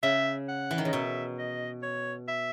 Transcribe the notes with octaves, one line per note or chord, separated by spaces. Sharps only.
C#3 E5
F#5
E3
D#3
C#3 D#5
B2 E5
D#5
C#5
E5